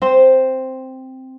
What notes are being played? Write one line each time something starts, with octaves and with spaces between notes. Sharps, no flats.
C4 C5